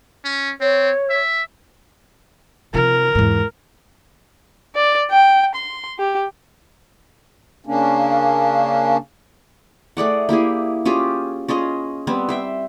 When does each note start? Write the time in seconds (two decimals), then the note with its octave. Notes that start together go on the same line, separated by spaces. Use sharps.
0.24 C#4
0.61 C4 C#5
1.10 E5
2.74 C3 F3 A#4
3.15 E2 G#2
4.76 D5
5.11 G5
5.55 C6
5.99 G4
7.66 C#3 A#3 C#4 D4
9.97 A3 G#4 D5 F#5
10.29 A#3 E4 G4 G#4
10.85 C#4 F4 G4 G#4
11.49 C#4 F4 G#4 D#5
12.07 G3 B3 C4
12.29 C5 E5 G5